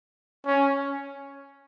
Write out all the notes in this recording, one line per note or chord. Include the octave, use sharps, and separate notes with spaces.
C#4